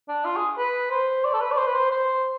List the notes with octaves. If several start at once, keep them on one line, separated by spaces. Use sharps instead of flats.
D4
F4
G#4
B4
C5
D5
A4
B4
D5
C5
B4
C5
C5